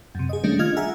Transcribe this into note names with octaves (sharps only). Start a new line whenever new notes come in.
F#2 C3
G#4 D#5
D#3 G3 A3 A#3 C#4 D4
F4 D#5 F6 G#6
G#4 E5 F#5 G#5 A#5